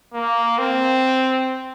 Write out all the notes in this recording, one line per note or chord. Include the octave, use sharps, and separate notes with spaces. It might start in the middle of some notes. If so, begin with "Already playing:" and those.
A#3
C4